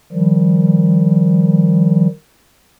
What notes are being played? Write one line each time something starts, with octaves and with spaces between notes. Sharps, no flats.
D#3 F3 G3